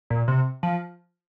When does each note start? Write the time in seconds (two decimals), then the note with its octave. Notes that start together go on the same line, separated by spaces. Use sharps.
0.10 A#2
0.28 C3
0.63 F3